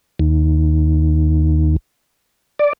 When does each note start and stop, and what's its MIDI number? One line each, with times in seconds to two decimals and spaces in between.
0.19 1.76 39
2.59 2.73 74